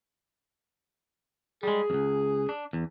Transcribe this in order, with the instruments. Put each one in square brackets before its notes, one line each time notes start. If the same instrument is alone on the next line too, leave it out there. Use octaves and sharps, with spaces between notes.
[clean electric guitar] G3 G#3 [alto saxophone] G#4
[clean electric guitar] C#2 F#2
D4
E2